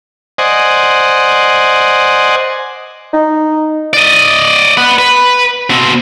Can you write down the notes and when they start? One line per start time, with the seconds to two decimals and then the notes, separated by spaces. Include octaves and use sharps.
0.38 C5 D5 D#5 F#5 G#5
3.14 D#4
3.93 D5 D#5
4.77 B4 F#5
4.99 B4
5.70 B2 C4